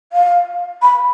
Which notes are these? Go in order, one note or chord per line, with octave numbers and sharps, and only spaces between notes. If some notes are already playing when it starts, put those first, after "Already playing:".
F5
B5